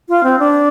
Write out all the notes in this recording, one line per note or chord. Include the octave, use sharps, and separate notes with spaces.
F4
C4
D4